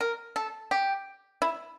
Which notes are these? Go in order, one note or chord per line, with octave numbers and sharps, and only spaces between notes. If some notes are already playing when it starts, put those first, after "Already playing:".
A#4
A4
G4
E4